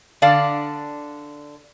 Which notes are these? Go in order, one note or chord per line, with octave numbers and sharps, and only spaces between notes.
D3 D4 D5 F5